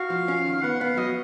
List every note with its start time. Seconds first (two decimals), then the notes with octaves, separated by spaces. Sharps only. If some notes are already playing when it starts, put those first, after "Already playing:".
Already playing: F#4 F5
0.10 F3
0.28 C#4
0.46 D#3
0.63 B3 F#5
0.80 B3 F5
0.97 F#3 D#5